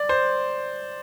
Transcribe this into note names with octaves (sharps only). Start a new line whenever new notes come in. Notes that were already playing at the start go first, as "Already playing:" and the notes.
Already playing: D5
C5